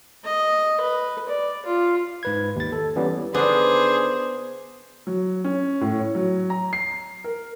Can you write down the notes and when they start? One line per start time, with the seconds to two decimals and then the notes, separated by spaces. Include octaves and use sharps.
0.25 D#5
0.81 B4
1.28 D5
1.66 F4
2.23 G#2 B4 G#6
2.56 D#2 A6
2.72 A4
2.96 E3 G3 B3 C#4
3.34 D3 D#3 B3 G#4 C5
5.07 F#3
5.44 C#4
5.81 A2
5.99 C#5
6.15 F#3
6.50 A#5
6.73 C7
7.24 A#4